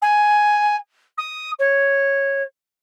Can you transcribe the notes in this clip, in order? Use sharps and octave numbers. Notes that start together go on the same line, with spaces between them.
G#5
D#6
C#5